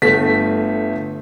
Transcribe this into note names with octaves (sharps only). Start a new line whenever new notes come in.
G1 A3 B6